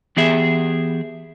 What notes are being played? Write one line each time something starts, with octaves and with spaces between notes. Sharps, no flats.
E3 B3 G4 G#4 E5